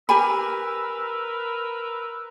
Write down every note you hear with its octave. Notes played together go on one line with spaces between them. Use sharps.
G4 A#4 B4 G#5 B5 E6